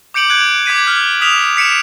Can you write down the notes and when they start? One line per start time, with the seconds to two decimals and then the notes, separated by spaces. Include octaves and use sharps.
0.14 D6 G6 C#7 D7 F#7
0.30 F#6 G#6 D7
0.66 D6 G#6 B6 D#7
0.87 F6
1.21 D#6 F6 B6 E7 F7
1.57 B6 C#7 D7 E7